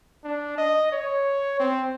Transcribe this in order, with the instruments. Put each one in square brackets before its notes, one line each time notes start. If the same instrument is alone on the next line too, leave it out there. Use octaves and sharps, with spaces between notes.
[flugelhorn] D4
D#5
C#5
C4